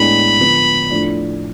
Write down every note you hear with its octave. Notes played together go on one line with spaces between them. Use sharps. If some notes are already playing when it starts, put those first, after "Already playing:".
Already playing: A2 G#3 B3 D4 B5
D3 F3 B3
A2 F3 A3 D4